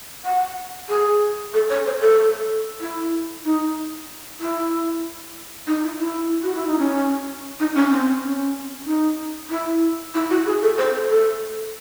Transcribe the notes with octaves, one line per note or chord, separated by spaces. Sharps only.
F#5
G#4
A4
C#5
C5
A4
E4
D#4
E4
D#4
E4
E4
F#4
E4
D#4
C#4
D#4
C#4
C4
C#4
D#4
E4
E4
F#4
G#4
A4
C5
A4
A4